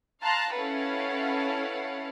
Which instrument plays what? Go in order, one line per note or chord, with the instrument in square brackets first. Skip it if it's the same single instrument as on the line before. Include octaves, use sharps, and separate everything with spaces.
[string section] F5 A5 A#5 C6 F#6
C#4 E4 A4 B4 F5 F#5